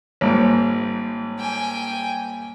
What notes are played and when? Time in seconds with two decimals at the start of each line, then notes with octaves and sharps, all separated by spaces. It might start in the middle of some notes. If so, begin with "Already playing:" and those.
0.21 G#1 G#2 G3 A#3 C#5
1.39 G5 G#5